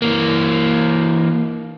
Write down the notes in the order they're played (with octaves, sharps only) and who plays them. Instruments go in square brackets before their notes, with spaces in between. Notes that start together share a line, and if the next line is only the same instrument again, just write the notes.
[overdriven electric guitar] E3 A#3